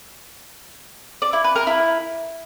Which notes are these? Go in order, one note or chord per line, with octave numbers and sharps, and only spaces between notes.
D5
E4
B4
A#4
E4